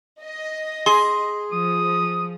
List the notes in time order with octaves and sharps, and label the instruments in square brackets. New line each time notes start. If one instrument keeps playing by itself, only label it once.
[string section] D#5
[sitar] G#4 [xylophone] C6
[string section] F3 [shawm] D#6